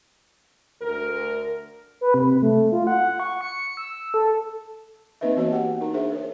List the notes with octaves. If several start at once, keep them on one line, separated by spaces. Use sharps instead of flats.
D2 A#4
B4
C3
A3
F4
F#5
C#6
C#7
E6
A4
A#3 C4 D#4 B4 D#5 E5
E3 B3 D#4 F#4 C#5 D#5
G4 F#5 G5
D#4 A#4 A#5
D4 D#4 G#4 C5 E5
A#4 C#5